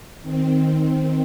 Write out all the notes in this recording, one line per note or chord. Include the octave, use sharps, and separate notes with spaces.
D#3 C4